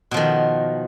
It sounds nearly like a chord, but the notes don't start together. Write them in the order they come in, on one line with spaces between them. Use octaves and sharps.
B2 F3 D#3